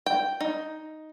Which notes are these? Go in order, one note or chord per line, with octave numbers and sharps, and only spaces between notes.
G5
D#4